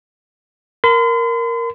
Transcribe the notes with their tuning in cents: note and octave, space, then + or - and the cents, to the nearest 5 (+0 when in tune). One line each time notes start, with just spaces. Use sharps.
A#4 +0 C6 -45